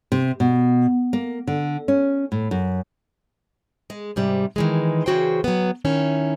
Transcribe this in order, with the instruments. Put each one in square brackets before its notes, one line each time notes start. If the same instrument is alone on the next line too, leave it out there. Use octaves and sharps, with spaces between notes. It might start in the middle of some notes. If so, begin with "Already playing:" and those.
[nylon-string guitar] C3
B2
A#3
D3
C#4
A2
F#2
[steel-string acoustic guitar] G#3
G#2 C3 G3
D#3 E3 G#3
C#3 E3 F#4 G#4 C5 G5
F#3 B3
D#3 C#4 E4